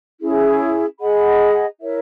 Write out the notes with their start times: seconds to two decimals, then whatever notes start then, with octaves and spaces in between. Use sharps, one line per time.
0.20 C#4 E4 G#4
1.01 G#4 D#5 F#5 B5
1.80 E4 A#4 C#5 E5